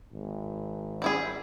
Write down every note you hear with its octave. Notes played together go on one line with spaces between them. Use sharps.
G#1
G3 E4 G#4